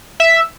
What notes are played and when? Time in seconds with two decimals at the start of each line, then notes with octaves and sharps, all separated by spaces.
0.20 E5